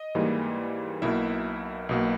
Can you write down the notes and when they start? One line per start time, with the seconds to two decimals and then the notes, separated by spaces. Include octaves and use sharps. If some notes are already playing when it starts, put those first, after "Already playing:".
Already playing: D#5
0.15 G#2 E3 G3 A#3
1.02 B1 B2 A#3 E4 E5
1.89 B1 B2 A#3